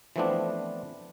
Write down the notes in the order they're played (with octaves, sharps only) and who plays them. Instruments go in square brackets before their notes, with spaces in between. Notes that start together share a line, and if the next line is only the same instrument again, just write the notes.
[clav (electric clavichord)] E3 F3 A3 B3 C4 D4